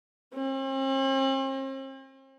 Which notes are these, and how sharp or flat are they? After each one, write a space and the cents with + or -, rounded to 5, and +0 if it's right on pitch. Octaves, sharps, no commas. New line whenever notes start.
C4 +45